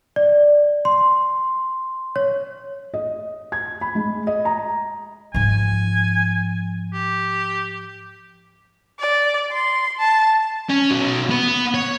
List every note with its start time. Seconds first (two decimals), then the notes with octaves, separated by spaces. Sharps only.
0.16 D5
0.85 C6
2.16 C#5
2.94 D#5
3.52 G#6
3.81 B5
3.95 G#3
4.27 D#5
4.45 A#5
5.34 G#2 F3 G#5
6.93 G4
8.99 D5
9.52 C6
9.99 A5
10.70 C#4
10.91 B2 F#3
11.30 B3
11.74 C#5